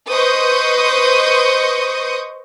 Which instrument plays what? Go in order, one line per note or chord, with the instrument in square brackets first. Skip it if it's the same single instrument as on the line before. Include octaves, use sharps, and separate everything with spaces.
[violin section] B4 C5 D#5 C#6 D#6 G6